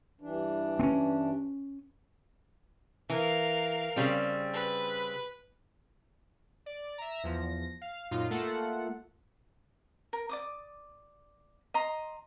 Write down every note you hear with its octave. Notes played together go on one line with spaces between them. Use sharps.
G2 E3 D4
C4 C#4
E3 A#4 F5
C#3 G3 C4
B4
D5
E5 A#5
E2 F3 A#6
F5
F#2 A#2 D#4 F4
A3 A#3 F4 A4 F#5
A#4
D5 D6 D#6
D#5 A#5 C6